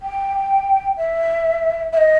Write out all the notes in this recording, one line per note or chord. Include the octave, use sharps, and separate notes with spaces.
G5
E5
E5
D#5